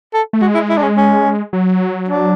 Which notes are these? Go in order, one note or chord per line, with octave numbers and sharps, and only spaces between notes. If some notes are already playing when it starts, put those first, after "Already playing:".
A4
A3
G#3 F#4
E4
E4
D4
C#4
C#4
F#3
D4